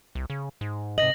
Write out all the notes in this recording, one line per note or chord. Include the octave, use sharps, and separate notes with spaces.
C2
C#3
G#2
C3 D#5 A#6 F#7